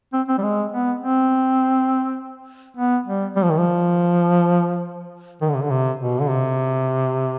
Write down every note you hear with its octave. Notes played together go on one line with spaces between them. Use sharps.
C4
C4
G3
G#3
B3
C4
B3
G3
G3
F3
D#3
F3
D#3
D3
C3
D3
C3
B2
D3
C3